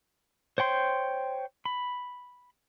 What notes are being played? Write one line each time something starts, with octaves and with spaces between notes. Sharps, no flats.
C5 C#5 G5 C6
B5